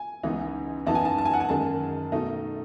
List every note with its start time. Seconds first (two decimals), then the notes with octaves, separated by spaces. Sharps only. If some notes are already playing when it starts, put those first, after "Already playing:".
Already playing: G#5
0.23 C#2 C#3 E3 B3 D#4
0.86 F#2 E3 B3 D#4 A5
0.95 G#5
1.05 A5
1.18 A5
1.25 G#5
1.33 F#5
1.40 G#5
1.49 F#2 D#3 G#3 A5
2.12 B2 A3 D#4